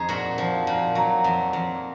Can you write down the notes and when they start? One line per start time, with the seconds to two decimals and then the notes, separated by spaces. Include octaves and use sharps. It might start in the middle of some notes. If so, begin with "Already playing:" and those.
Already playing: F2 D#4 G#4
0.09 A#2 F#4
0.38 F3
0.67 A#2
0.95 F#3
1.24 F2
1.53 F2